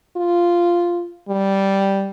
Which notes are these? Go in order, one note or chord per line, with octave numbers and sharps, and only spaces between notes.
F4
G3